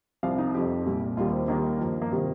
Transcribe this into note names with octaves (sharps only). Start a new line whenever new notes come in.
C2 C3 F3 F5
D#4
F2 F3 G4
C2 A#2 G3
D#2 D#3 G3 F4
C4
D#2 D#3 G3 A#3
G2 F3
A#3
C3 D#3 G3 C4